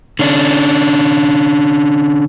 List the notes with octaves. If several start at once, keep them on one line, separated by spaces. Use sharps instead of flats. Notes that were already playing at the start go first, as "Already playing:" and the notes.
D3 C#4 D4